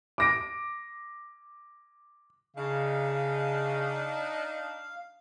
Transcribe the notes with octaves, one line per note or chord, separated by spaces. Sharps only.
D6 A#6 D7
C#3 D4 D#4 F5